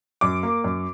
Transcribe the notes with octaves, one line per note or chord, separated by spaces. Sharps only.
F#2 D6
A#3
F#2